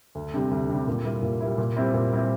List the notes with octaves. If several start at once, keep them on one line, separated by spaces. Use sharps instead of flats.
D2
C3 G3 D4 G4
D2
C3 G3 D4 G4
A#2
G3 A#3 E4
A#2
G3 A#3 E4
A#2
G3 C4 E4
A#2
G3 C4 E4